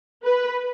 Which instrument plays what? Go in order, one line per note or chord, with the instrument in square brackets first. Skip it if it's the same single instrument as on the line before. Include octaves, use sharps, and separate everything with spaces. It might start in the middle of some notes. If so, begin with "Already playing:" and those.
[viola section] B4